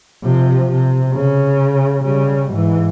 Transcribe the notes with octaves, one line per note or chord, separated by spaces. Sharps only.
C3 F3
C3
C#3
C#3 G3
G#2 E3